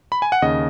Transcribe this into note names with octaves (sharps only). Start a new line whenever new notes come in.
B5
G#5
F#5
D#2 C#3 D#5